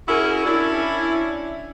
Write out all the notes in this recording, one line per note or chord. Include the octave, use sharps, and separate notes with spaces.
C#4 E4 F#4 G#4 A#4
C#4 D4 E4